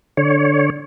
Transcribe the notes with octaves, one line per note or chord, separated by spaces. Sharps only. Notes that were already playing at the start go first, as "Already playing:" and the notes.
D3 C#5